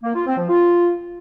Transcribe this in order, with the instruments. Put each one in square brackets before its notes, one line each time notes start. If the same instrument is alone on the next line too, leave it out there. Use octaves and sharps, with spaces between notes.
[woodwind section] A#3
F4
C4
F3
F4